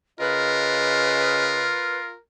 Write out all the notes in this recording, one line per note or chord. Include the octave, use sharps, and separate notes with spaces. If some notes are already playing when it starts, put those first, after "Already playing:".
C#3 F4 A#4 B4 D#5